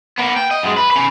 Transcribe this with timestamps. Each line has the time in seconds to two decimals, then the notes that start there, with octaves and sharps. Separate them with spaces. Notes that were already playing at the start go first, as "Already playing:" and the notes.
0.18 A#3 B3
0.36 G5
0.51 D#5
0.63 F#2 G#3
0.76 B4
0.91 C#4 B5